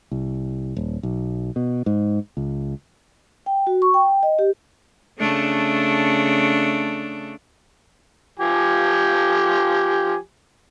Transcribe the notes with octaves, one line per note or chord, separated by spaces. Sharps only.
C2
D#1
B1
B2
G#2
C#2
G5
F#4
C#6
G5
D#5
G4
C#3 A3 D4
F3 G4 G#5